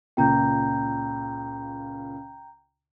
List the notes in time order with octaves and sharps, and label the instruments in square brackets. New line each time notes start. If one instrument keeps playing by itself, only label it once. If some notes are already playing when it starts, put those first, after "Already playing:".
[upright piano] C#2 A#2 C#3 [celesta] G5 A#5 G6